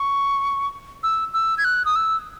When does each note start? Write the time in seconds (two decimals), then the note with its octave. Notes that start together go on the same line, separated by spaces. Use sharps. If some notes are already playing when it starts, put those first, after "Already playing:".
Already playing: C#6
1.03 E6
1.34 E6
1.58 G#6
1.64 F#6
1.85 D#6
1.96 E6